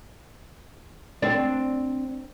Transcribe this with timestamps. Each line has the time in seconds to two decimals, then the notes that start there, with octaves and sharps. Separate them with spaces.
1.22 C4 D4